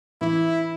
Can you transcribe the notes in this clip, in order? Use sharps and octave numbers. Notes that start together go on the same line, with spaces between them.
E3 E4